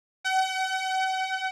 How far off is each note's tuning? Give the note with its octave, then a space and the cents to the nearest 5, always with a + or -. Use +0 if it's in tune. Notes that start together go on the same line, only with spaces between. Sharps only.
F#5 +40